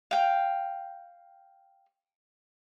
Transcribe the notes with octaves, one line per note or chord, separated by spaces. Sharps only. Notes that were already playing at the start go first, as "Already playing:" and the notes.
F5 G5